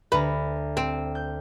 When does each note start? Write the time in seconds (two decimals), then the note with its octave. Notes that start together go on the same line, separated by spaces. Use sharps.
0.12 D2 B4 A#5
0.77 C4
1.15 G6